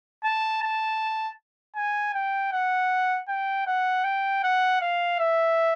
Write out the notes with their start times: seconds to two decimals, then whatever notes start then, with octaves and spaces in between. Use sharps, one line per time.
0.24 A5
0.62 A5
1.76 G#5
2.14 G5
2.52 F#5
3.28 G5
3.67 F#5
4.04 G5
4.43 F#5
4.81 F5
5.19 E5